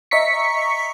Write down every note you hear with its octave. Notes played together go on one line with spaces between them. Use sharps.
D#5 E5 A#5 C#6 B6 C#7